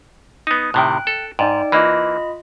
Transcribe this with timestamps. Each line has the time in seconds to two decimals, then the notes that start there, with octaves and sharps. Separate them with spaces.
0.47 B3 D#4 D#6
0.74 A2 C3 D#3 G5 F#6
1.07 A4
1.39 G#2 D#4 D5 G5
1.72 E3 A#3 F4 D#5 B5